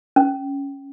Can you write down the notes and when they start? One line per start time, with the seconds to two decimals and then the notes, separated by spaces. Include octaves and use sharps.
0.16 C#4